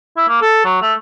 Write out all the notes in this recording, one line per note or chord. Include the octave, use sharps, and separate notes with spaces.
E4
A#3
A4
F#3
A3